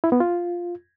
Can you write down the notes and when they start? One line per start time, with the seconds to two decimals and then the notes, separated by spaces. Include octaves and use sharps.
0.04 E4
0.12 B3
0.20 F4